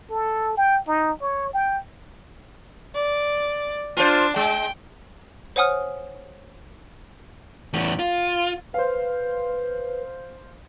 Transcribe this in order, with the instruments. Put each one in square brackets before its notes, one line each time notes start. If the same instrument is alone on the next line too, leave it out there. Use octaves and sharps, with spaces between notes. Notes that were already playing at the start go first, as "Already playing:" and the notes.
[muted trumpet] A4
G5
D#4
C#5
G5
[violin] D5
[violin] D4 [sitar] F4 C5
[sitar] G#3 [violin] G5
[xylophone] C5 C#5 F#5 G#5 D#6 F6
[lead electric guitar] E2 A2
F4
[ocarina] B4 [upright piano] C5 F5